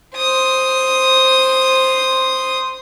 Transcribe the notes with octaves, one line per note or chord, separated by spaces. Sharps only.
C5 D#6